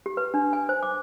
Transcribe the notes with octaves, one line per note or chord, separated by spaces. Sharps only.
G4
B4
D4
G#5
C5
D6